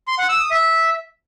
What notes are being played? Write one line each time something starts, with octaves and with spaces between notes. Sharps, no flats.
C6
F#5
E6
D#6
E5